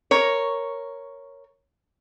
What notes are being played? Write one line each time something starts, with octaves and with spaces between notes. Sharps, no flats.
A#4 C#5